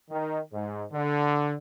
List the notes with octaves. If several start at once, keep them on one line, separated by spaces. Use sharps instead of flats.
D#3
G#2
D3